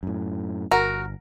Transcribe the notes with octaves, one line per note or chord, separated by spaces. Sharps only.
F#2 A2
G1 F#4 A#4